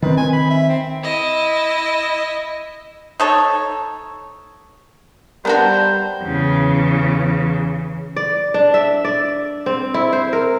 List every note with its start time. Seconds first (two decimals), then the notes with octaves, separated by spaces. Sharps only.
0.02 D#3 C4 B4
0.17 G#5
0.33 B5
0.50 E5
0.69 C4
1.03 E4 D#5
3.20 D#4 A4 C#5
5.45 G3 B3 D4 F#4 A#4 C5 F5 G5
6.22 E2 C#3
8.16 D5
8.54 D4
8.74 E5
9.04 D5
9.66 C4
9.94 E4
10.13 C5
10.33 A#4